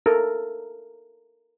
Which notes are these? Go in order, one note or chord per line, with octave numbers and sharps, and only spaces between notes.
A4 A#4